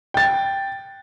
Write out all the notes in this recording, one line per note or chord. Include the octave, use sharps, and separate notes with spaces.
G5 A6